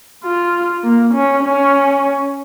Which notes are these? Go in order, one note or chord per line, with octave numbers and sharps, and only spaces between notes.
F4
A#3
C#4
C#4